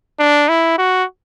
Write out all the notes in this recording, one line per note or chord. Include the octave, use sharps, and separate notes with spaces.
D4
E4
F#4